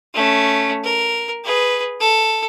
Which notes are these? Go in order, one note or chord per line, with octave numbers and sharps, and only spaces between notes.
A3 C#4
A#4
G#4 B4
A4